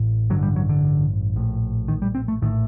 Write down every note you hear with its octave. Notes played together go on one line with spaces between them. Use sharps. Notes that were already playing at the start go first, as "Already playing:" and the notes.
Already playing: A1 A2
A1 G2 D3 F#3
G3
F#3
D3
A#1 A2
D#3
G3
C4
A3
A#1 A2 D#3